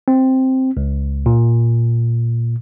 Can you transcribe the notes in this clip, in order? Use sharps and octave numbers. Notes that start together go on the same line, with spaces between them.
C4
C#2
A#2